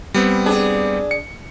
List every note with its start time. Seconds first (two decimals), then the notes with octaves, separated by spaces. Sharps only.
0.14 G3 B3 C4
0.46 D4 G#4
1.11 C#7